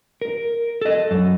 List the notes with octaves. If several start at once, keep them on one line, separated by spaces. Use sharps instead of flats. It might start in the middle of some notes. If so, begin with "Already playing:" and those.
A#4
A4 D#5
F#2